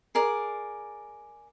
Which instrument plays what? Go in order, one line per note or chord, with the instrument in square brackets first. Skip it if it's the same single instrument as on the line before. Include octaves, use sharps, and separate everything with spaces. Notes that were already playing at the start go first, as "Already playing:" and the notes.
[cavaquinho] G#4 A#4 D5